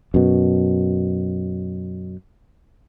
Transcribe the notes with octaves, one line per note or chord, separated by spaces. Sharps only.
F#2 B2